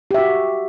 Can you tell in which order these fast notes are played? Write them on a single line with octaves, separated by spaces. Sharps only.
G4 E5 F#4